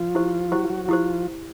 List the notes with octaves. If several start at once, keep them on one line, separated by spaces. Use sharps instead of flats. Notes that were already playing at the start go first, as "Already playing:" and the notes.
Already playing: F3 F4
E4 G4 C5
F#3 E4 F#4 G4 C5
F4
F#3 F#4
F#4
F3 E4 F4 G4 C5